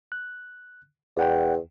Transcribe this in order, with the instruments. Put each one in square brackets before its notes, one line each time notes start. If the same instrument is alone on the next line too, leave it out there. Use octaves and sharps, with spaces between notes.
[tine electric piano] F#6
[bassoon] E2 [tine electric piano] D5 F#5 G5